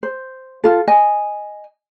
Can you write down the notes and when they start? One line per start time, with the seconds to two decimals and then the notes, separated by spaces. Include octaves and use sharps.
0.03 C5
0.64 F4 A4
0.88 D#5 G#5